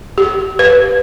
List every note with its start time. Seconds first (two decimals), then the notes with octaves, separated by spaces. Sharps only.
0.18 G4
0.59 B4